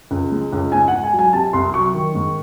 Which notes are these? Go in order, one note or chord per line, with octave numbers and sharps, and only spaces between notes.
C#2
G#3
C#2
G#2 G#5
G#2 F#5
G#5
F#3
G#5
C3 A5
C2 C6
F#3 C#6
D#3
G#2